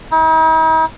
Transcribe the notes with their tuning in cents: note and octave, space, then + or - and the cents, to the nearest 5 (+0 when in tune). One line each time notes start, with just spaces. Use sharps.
D#4 +45